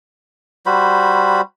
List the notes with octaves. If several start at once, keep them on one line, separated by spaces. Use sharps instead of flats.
G3 F#4 C5 B5